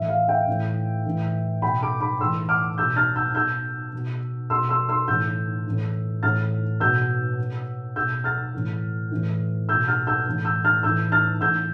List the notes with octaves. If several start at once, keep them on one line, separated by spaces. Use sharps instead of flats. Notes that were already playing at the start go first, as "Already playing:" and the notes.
Already playing: A2 E3 E5
F5
E5 G5
A2 E3
A2 E3
B2 G5 B5
B5 D6
B5 D6
A2 E3 C6 E6
D6 F6
B2 E6 G6
F6 A6
E6 G6
B2 E6 G6
B2
B2 C6 E6
C6 E6
C6 E6
A2 E3 E6 G6
A2 E3
A2 E3 F6 A6
B2 E6 G6
B2
B2 E6 G6
F6 A6
A2 E3
A2 E3
B2 E6 G6
F6 A6
E6 G6
A2 E3
E6 G6
F6 A6
A2 E3 E6 G6
F6 A6
A2 E3 E6 G6